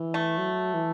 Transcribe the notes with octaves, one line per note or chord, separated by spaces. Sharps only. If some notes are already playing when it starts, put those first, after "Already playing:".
Already playing: E3
A3
F#3
E3